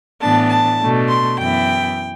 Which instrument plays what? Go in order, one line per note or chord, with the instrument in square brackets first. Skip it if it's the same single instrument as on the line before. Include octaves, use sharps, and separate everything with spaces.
[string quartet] A2 E3 B3 D4 A5
A5
B2 A3 D4
C6
F#2 E3 B3 E4 G5